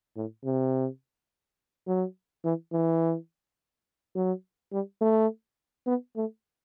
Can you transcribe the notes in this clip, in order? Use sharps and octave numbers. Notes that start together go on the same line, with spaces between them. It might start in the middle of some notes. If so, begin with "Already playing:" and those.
A2
C3
F#3
E3
E3
F#3
G3
A3
B3
A3